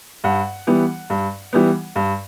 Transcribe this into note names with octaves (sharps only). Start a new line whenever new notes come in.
G2 F#5
E3 G3 B3
G2
E3 G3 B3
G2